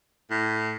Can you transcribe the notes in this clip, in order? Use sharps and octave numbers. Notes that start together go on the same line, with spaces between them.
A2